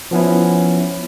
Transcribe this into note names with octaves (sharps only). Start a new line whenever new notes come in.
F3 B3 C#4 E4